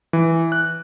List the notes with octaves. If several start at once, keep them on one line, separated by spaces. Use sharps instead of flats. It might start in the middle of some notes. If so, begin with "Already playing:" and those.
E3
F#6